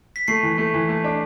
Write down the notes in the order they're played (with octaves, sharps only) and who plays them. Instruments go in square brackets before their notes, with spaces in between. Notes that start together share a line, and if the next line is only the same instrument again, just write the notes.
[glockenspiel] B6
[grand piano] A3 [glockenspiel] C7
[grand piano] E3
A3
E3
A3
D4